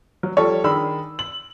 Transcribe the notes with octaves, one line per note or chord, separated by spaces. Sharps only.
F#3
F3 G3 A4 C#5
D#3 D4 G#4 B5 E6
F#7